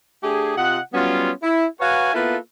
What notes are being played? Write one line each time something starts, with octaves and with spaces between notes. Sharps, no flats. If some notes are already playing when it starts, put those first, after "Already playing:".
A3 D4 G4 G#4
C3 F4 D#5 F#5
F#3 G3 B3 C#4 F4
E4
F#4 B4 C#5 F5 F#5 G#5
A#3 B3 E4 F4 A4 B4